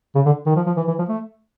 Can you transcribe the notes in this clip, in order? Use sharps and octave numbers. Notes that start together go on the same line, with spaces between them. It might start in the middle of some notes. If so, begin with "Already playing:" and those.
C#3
D3
D#3
F3
F3
E3
E3
F3
A3